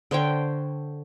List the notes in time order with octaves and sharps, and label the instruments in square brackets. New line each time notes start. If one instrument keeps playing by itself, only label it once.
[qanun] D3 C5 C#5 G5